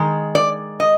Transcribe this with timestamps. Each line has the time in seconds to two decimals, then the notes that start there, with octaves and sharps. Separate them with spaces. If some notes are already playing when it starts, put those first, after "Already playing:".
Already playing: D#3 G#3
0.35 D5
0.80 D#5